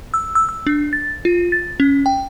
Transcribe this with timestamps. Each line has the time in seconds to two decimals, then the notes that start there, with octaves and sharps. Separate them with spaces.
0.14 E6
0.35 E6
0.49 E6
0.67 D4
0.93 A6
1.25 F4
1.52 A6
1.80 C#4
2.06 G5